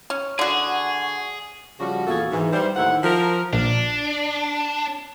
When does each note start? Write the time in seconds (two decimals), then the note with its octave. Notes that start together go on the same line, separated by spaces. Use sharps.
0.10 C#4
0.39 D3 F#4 G#4
1.80 C#3 F3 G3 F#4
2.07 E2 A#2 F#4 G#4 A4 F5
2.32 G#2 E3
2.53 G3 C5
2.76 D#2 A2 D#3 E4 F#5
3.04 F3 A#4
3.53 A#1 D4